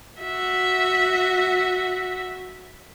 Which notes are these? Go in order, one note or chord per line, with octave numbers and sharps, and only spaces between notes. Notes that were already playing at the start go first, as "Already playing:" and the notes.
F#4 E5